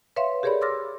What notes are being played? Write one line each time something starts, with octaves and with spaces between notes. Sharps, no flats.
B4 C#5 E5 F5 C6
G4 G#4 A#4 C#5 D5 B5
C6 D6 E6 F6 A6 A#6